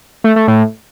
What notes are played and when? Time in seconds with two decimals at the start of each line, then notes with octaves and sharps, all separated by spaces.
0.24 A3
0.36 A3
0.48 A2